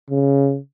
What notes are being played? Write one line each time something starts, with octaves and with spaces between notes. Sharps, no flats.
C#3